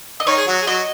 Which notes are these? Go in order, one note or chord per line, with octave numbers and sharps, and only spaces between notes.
D#5
D#3 D#4 C#5
G#4
F#3 F#4
G#4
F#3 F#4 D#5